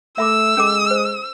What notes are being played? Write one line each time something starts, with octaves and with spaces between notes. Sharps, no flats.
A3 E5 B5 D6 E6
G#3 C#4 A4 D6
C5